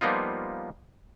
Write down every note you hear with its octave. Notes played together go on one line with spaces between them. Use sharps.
F3 G3 A#3 B3 D#4 F4